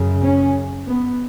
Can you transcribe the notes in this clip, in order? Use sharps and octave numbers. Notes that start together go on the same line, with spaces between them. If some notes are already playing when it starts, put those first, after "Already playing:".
Already playing: F#2 C#3
C#4
B3